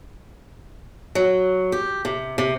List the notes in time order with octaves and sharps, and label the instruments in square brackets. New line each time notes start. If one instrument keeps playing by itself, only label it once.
[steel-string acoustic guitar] F#3
G4
C3
C3